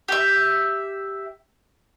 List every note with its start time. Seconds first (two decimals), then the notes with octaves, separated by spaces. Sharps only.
0.08 G4 E5